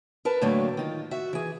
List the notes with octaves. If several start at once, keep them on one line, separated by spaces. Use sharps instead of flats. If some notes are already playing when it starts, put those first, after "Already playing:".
A#4 B4 A5
A2 D3 F#3 A3 A#3
D#3 F4
F#4 E5
E3 G#4